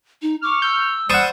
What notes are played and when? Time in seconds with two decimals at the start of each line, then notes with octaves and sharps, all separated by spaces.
0.22 D#4
0.43 C#6 D6 F6
0.62 E6 G6
1.10 G3 C5 F#5 A5 C#6 D#6